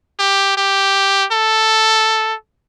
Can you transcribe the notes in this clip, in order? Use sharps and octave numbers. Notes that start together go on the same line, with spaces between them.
G4
G4
A4